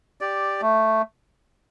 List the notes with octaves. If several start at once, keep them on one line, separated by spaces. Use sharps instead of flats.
G4 D5
A3